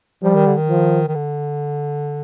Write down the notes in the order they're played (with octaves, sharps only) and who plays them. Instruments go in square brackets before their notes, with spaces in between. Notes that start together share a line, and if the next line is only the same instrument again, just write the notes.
[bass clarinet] F3 [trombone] G3
[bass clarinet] D#3
D3
D#3
[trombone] F3
[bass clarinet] D#3
D3